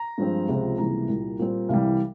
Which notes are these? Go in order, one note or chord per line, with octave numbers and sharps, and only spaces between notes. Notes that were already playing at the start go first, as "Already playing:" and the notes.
Already playing: A#5
G2 F3 G#3 C4
C#2 C3 F3 C4
C#2 C3 E3 G3 A#3 A#5
C2 A#2 G3
A#2 G3 C4
C2 C3 E3 G3 F5